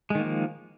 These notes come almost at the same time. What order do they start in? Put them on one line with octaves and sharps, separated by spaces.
G#3 D#3 A#3 F3